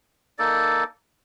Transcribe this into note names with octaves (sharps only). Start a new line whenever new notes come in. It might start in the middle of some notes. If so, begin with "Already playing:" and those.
A#3 D#4 A4 D5